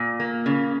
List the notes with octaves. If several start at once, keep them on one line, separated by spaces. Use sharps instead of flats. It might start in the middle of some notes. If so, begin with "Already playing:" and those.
Already playing: A#2
A#3
C#3